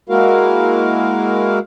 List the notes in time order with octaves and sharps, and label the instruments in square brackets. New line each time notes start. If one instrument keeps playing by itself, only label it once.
[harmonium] G#3 A#3 E4 F#4 A#4 F5